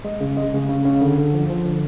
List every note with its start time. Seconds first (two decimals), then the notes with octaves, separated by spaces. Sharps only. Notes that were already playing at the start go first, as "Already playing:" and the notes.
0.05 G#3
0.21 C#3
0.37 G#3
0.53 C#3
0.69 C#3
0.85 C#3
1.01 D3
1.18 D3
1.34 F3
1.50 F3
1.65 D3